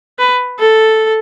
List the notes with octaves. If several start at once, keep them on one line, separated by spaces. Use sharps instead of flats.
B4
A4